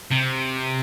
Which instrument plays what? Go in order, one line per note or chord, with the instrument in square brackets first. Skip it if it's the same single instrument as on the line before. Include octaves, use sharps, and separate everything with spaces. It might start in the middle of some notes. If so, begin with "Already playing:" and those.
[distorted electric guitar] C3